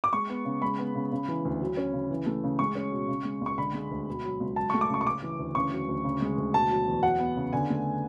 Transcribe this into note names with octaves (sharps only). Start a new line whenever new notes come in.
D6
G#3 C#6
B3
C#3
G#3 B5
B3
C#3
C#3
E3
D2
F#3
C#4
C#3
E3
A3
C#3
G#3 C#6
C#4
B2
C#3
G#3
C#2 C#6
D3 B5
G#3
D2
B2
F#3
C#2
F#3 A5
A3 C#6
D6
C#3 C#6
C#6
C#3 D6
E3
D2
C#3 C#6
F#3
D2
C#3
G#3
D2
B2 A5
F#3
E2
F#3 F#5
B3
C#3
D3 G#5
A3